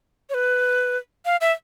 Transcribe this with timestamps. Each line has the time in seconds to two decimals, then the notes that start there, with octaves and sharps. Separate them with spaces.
0.30 C#5
0.34 B4
1.25 F5
1.41 E5